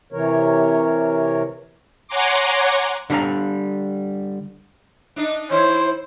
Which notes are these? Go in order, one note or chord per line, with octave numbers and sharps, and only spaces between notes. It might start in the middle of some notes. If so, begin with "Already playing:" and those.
C3 E3 A#4 C#5
C#5 F#5 G#5 A#5 C6 D6
D3 G3 D4 F5 A#5
D4 D#4 D#5
E3 E4 C5 C#5